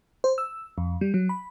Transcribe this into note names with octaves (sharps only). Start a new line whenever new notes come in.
C5
E6
F2
G3
F#3
B5